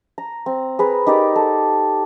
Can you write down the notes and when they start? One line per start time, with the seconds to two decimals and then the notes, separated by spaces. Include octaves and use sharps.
0.18 A#5
0.46 C4
0.79 G#4 B4 A#5
1.07 D#4 G4 A#4 D5
1.36 A4